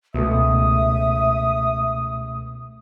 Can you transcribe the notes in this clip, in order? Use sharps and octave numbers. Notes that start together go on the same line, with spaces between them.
C#2 B2 A3 E5 D#6